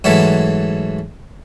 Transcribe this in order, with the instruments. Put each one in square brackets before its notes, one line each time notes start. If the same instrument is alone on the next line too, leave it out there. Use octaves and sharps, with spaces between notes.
[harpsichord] G#2 E3 F#3 A3